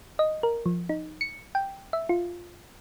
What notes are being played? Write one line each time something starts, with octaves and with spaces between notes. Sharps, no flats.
D#5
A#4
F3
D#4
C#7
G5
E5
F4